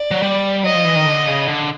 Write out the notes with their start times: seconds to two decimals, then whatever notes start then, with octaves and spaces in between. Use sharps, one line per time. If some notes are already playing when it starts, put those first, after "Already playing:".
Already playing: D5
0.11 F#3
0.22 G3
0.64 F#3 D#5
0.75 F3
0.85 E3
0.96 D#3
1.06 D3
1.27 C#3
1.47 D3